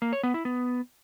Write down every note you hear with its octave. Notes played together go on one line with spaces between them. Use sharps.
A#3
C#5
B3
E4
B3